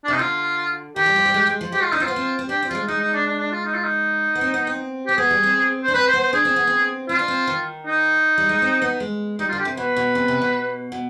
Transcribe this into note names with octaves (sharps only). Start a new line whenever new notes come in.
D4
C3 D#4
D3 F4
D#3 G4
G3
F3
G3
G#3
G#3
F3
G#3 G4
F4
D4 D#4
C4 F4
B3
C4
C4
D4 G4
C4
G3 F4
G#3
G#3 D#4
D#4
D4
D4
D4
F4
D#4
F4
D#4
B3
C4
B3
C4
C4 G4
B3 G#4
G3
C4
D4 C5
C4 B4
C5
B3
C5
D4 G#4
C4
B3
C4
C4 F4
D4
C4
D#3
D#4
G3
G#3
C4
B3
G#3
G3 D#4
F4
D3
G4
C3
B2 B4
B2
C3
C3
B2
B2